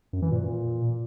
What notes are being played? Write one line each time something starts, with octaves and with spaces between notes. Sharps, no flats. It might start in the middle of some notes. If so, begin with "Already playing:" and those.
F#2
E3
A#2